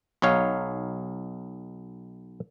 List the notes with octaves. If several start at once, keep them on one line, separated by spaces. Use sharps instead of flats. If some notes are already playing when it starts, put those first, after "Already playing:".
B1 D#4 C#5 F5